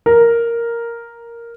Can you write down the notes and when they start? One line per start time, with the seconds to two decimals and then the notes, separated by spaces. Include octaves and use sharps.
0.06 A#4